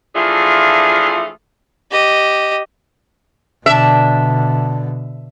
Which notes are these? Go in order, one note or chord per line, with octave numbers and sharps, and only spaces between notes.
E3 F3 A3 D4 F4 G#4
G4 D#5
B2 D3 D4 E5